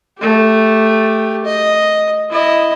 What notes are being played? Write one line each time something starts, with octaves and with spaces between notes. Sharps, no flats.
A3 G4
D#5
E4 D#5